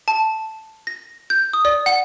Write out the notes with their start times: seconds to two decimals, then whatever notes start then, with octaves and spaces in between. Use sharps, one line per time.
0.08 A5
0.87 A#6
1.30 G6
1.53 D#6
1.65 D5
1.86 F#5